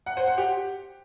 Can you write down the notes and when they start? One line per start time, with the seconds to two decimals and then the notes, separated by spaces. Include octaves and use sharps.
0.06 F#5
0.17 C5
0.27 F#5
0.38 G4